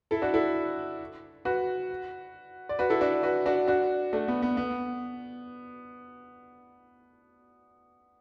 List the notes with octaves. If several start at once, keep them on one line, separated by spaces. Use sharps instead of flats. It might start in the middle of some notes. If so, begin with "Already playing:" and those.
E4 A4
D4 F#4
E4 A4
F#4 B4
D5
F#4 B4
E4 A4
D4 F#4
F#4 B4
D4 F#4
D4 F#4
A3 D4
B3
B3
B3